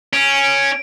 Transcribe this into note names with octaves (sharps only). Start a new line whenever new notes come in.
C#4 D7
D7